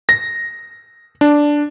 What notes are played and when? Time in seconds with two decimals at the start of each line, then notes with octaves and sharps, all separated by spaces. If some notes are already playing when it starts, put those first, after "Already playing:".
0.09 A#6
1.21 D4